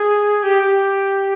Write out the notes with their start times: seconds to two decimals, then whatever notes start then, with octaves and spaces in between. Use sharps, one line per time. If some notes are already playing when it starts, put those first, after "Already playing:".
Already playing: G#4
0.43 G4
0.63 G4